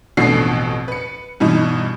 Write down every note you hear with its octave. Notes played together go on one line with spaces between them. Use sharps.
A1 F2 B2 D3 C7
B4 C#7
G2 B2 E3 D#4